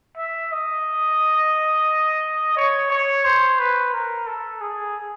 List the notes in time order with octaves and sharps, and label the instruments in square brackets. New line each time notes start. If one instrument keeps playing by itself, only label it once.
[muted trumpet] E5
D#5
C#5
C#5
C5
B4
A#4
A4
G#4